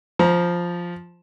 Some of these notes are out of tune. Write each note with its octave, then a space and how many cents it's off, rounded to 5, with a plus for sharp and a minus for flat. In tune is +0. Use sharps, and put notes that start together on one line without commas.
F3 +0 C5 +0 A#5 +25